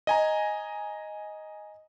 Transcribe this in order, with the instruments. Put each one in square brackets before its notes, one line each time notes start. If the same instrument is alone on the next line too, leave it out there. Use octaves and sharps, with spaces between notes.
[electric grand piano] D#5 G#5 A#5